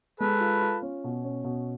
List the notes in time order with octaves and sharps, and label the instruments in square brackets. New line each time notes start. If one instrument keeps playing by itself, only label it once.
[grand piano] G#3 [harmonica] A4 B4
[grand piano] F4
F4
C#4
B2
C#4
B2